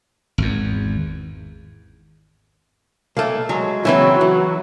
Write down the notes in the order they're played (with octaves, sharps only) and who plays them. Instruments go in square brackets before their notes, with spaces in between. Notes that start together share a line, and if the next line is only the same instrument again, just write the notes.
[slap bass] G#1 E2
[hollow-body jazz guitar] B1 A3 [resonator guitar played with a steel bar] A#3
[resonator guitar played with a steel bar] F#3 [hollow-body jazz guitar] G#3
[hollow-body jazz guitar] C#3 E3 C4 [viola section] F#3 [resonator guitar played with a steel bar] E4 B4
[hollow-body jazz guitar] E3